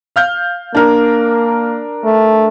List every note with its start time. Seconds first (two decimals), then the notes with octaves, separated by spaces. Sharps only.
0.16 F5 F6 G6
0.75 A#3 D4 A#4
2.04 A3